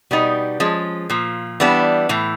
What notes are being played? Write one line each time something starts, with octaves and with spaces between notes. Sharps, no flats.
B2 G3 B3 D#4
F3 G#3 C#4
A#2 F3
E3 G3 B3 D4
A2 E3